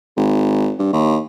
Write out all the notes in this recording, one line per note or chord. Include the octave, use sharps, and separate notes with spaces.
G#1
G2
D#2